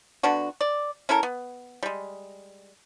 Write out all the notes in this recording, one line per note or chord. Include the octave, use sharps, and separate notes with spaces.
D3 B3 D4 F#4
D5
C#4 E4 A4 A#4
B3
G3 G#3